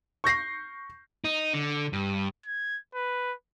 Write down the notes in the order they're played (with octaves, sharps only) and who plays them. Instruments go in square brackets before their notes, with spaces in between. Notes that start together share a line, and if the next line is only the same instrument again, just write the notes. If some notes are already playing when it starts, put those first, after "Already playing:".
[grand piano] C#6 G6 A#6 C7
[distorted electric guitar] D#4
D3
G2
[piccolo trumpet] G#6
B4